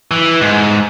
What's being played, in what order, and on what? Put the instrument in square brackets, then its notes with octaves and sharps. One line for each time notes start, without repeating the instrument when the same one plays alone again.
[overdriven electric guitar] E3
G#2